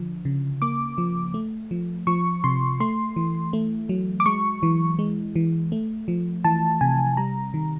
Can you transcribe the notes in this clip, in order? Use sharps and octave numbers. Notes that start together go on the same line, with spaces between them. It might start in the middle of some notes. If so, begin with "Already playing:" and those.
Already playing: D3 F3
C#3
A#3 D6
F3
A3
F3
F3 C#6
C3 C6
A3 C6
E3
A3
F#3
D6
G#3 C#6
E3
G#3
E3
A3
F3
E3 A5
C3 G#5
G3 A#5
D#3